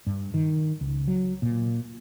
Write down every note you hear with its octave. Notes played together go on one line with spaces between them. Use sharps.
G2
D#3
C#2
F#3
A#2